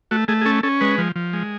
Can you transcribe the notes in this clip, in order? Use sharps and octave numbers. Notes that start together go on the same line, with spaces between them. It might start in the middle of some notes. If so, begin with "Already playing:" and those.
A3 F#4
A3 G#4
G#4
C#4 A4
C#4 A4
G#3 B4
F3
F3
G#3